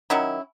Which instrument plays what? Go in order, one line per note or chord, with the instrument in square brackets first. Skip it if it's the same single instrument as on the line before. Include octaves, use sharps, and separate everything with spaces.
[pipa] D#3 F#3 C#4 E4